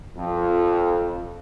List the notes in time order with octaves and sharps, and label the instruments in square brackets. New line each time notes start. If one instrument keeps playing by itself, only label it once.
[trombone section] F2